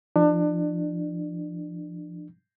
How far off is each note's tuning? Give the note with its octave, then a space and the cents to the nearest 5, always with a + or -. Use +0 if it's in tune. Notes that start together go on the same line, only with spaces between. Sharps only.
F3 -25 D4 +30